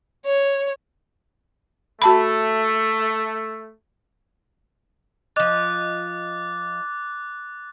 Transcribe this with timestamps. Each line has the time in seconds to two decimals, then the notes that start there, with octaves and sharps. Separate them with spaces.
0.25 C#5
2.02 A3 F#4 A5 B5
5.36 F3 D#5 D6 F#6 A6